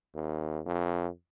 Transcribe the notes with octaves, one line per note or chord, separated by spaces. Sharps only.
D#2
F2